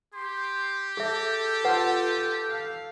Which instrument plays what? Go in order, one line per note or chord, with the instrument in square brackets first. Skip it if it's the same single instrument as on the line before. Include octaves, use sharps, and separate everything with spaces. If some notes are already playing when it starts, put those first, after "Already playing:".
[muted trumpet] G4 [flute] C6
[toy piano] G#4 E5 [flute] A4
[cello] F4 [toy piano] B4 F#5
[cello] F5